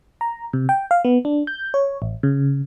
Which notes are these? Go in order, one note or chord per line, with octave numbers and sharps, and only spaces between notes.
A#5
C3
G5
F5
B3
D4
G6
C#5
A1
C#3